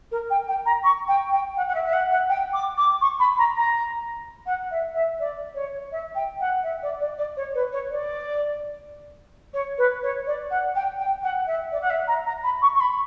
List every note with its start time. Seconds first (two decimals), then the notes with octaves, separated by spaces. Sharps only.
0.11 A#4
0.30 G5
0.48 G5
0.65 A#5
0.84 C#6
1.08 G5
1.32 G5
1.56 F#5
1.68 F#5
1.74 E5
1.86 E5
1.93 F#5
2.11 F#5
2.29 G5
2.53 D6
2.77 D6
3.01 C#6
3.19 B5
3.38 A#5
3.55 A#5
4.46 F#5
4.71 E5
4.94 E5
5.19 D5
5.54 C#5
5.92 E5
6.15 G5
6.40 F#5
6.63 E5
6.82 D5
7.01 D5
7.18 D5
7.37 C#5
7.54 B4
7.72 C#5
7.90 D5
9.53 C#5
9.78 B4
10.02 C#5
10.26 D5
10.50 F#5
10.75 G5
10.99 G5
11.23 F#5
11.47 E5
11.72 D5
11.81 F#5
11.90 E5
12.07 A#5
12.26 A#5
12.43 B5
12.62 C#6
12.74 C#6
12.80 B5